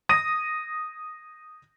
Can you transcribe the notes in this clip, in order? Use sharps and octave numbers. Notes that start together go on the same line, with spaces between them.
D#6 A#6 D#7